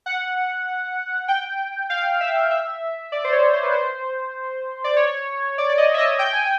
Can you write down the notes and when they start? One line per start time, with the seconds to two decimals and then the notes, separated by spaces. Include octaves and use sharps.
0.06 F#5
1.28 G5
1.90 F5
2.21 E5
2.51 E5
3.12 D5
3.24 C5
3.32 C#5
3.53 C5
3.63 B4
3.72 C5
4.84 D5
4.96 C#5
5.58 D5
5.70 D5
5.78 D#5
5.94 E5
5.98 D#5
6.19 G5
6.33 G#5